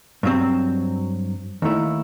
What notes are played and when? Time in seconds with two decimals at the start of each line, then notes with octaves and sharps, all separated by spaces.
0.23 G2 F#3 C4
1.62 D#2 D#3 A3 E4